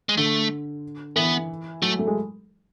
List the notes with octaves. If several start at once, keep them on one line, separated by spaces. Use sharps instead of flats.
G#3
D3 A3
E3 B3
F#3 A3
A3
G#3